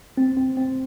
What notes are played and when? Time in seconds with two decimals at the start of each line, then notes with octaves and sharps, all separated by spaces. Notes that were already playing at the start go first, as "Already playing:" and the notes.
0.18 C4
0.37 C4
0.57 C4